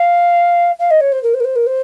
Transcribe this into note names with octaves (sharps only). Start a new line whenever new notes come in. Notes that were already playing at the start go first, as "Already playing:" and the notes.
Already playing: F5
F5
D#5
C#5
C5
A#4
C5
A#4
C5
A#4
C5